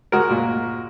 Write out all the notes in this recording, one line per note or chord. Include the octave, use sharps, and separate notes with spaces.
G#3 F#4 A#4
A#2